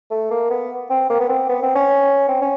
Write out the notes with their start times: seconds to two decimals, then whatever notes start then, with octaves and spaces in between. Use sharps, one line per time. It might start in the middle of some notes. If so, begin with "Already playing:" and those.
0.11 A3
0.31 A#3
0.50 B3
0.90 C4
1.10 A#3
1.20 B3
1.29 C4
1.49 B3
1.63 C4
1.75 C#4
2.28 C4
2.42 C#4